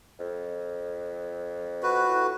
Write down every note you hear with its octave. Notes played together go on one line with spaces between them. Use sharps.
F2
F#4 B4
A2